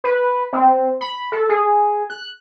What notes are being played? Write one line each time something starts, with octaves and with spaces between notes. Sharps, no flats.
B4
C4
B5
A4
G#4
F#6